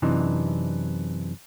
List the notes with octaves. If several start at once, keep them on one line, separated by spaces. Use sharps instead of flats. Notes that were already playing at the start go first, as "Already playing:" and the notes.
F#2 C3 E3 D4 D#4